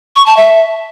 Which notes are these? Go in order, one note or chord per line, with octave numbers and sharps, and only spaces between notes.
C#6
A5
E5